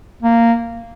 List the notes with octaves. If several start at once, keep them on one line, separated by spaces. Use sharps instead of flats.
A#3